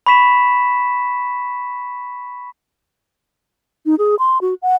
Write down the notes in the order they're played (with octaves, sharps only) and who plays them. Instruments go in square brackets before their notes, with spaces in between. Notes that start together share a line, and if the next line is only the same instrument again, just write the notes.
[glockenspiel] B5 C#6 B6 E7
[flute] D#4
G#4
C6
F#4
F#5